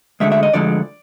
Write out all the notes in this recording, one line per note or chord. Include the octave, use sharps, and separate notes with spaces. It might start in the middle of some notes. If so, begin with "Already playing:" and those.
D2 D3 F3 G#3 E5
E5
D#5
D2 D3 F3 G#3 D5